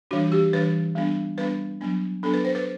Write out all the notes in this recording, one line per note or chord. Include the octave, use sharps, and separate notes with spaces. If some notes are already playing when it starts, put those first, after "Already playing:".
E3 G3 D4 F#4
G4
E3 G3 D4 B4
G3 B3 D4
G3 B3 D4 B4
F#3 B3 D4
F#3 B3 D4 A4
B4
C5
B4